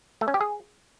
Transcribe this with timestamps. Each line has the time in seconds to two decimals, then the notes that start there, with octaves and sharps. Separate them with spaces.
0.21 A3
0.28 C#4
0.34 G4
0.41 G#4